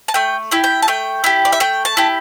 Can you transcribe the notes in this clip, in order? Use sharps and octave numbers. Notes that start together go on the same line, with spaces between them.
A5
A3 G5
E4 G4
G5
A5
A3 G5
E4 G4
D5
E5
A3 G5
A5
E4 G4